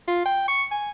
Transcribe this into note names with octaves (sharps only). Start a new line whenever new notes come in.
F4
G5
C#6
G#5